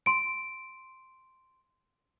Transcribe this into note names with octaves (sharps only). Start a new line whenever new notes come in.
C6 D7